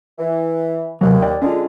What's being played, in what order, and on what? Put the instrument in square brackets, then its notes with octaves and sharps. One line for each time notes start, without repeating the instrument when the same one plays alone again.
[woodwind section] E3
[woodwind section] D#2 [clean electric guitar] C3 F#3
[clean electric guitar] D5 G5
[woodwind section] D3 G#3 [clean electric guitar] C#4 F4